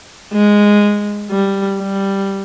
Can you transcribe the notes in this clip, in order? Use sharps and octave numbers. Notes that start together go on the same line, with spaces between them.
G#3
G3
G3